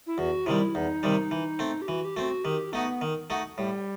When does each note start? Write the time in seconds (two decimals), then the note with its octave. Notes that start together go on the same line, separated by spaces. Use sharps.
0.07 E4
0.18 E2 F#4
0.46 C3 D#3 G3 E4
0.75 E2 D#4
1.03 C3 D#3 G3
1.31 E3
1.59 A3 C4
1.82 G4
1.88 E3 F#4
2.05 G4
2.16 A3 C4 F#4
2.44 D#3 G4
2.73 A3 B3 D#4 F#4
3.01 D#3
3.30 A3 D#4 F#4
3.58 A2 G3